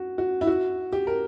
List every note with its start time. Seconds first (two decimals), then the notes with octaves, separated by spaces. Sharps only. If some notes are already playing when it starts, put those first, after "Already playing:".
Already playing: F#4
0.18 F#4
0.41 E4
0.47 F#4
0.93 G4
1.07 A#4